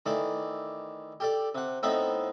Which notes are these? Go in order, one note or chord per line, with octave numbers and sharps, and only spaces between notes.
D#3 E3 A3 D5
G4 A4 D5
C3 F#5
A2 B3 C4 D#4 E5 B5